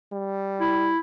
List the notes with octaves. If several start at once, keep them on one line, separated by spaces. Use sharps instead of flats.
G3
E4